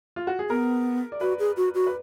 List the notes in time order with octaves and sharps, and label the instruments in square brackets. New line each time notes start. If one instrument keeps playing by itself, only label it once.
[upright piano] F4
F#4
G#4
[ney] B3 [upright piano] A#4
[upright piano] D5
[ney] F#4 [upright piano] B4
[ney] G#4
F#4
F#4
[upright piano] B4